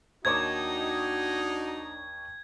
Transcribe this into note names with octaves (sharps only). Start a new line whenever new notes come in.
D#2 D4 D#4 F#4 C#5 D6 G#6